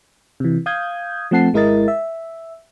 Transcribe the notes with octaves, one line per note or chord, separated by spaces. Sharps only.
C3 E3
F5 D#6 G6 G#6
F3 A3 C4 F#5 A5 C7
G#1 G#3 E4 A#4 D#5 A6
E5